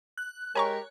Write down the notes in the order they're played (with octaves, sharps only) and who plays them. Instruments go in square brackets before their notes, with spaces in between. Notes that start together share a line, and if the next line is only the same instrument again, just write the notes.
[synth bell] F#6
[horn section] G#3 G4 A#4 [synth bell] C#5 [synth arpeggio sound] G#5 A#5 C#6